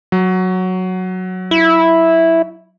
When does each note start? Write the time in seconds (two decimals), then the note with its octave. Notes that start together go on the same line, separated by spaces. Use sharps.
0.12 F#3
1.51 E4